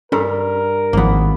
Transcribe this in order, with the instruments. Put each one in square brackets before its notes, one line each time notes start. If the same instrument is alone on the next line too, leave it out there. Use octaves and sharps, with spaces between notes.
[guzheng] G2 [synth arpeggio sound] C#4 A4 A#5 [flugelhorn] A#4
[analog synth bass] G#1 [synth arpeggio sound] G#2 F3 [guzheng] A#3 B3